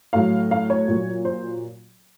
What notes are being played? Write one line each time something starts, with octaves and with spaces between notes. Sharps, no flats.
A2 F#3 F5
F5
C#5
A#2 F#3
C5